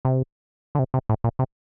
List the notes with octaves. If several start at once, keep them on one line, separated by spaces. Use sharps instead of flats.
C3
D3
C3
C3
A2
A#2
C3